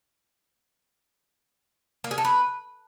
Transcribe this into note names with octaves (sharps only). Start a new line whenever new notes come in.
A#3
G#4
A4
B4